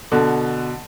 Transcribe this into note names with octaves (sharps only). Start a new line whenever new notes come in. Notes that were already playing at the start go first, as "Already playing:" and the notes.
B2 D3